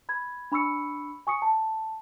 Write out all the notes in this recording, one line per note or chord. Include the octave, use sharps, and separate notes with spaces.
B5 G#6
D4 B5 C#6 E6 C#7
G#5 C#6 D#6 C#7
A5